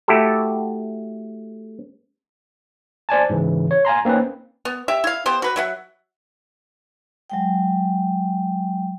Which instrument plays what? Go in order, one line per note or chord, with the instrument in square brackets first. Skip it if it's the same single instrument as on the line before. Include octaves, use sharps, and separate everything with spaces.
[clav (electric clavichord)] A3 E4 F#4 G4 A4
[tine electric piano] C5 D5 G#5 A5
G#2 C#3 E3
C#5
F5 G#5 A#5 C6
A#3 C4 C#4 D#4 B4
[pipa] B3
G4 E5
E4 F5
B3 G4 C5
F#4 B4
F#3 E5 F#5
[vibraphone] F#3 G#3 G5